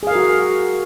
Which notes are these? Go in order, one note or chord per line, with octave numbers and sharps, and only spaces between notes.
F#4 G#4 A#4 F5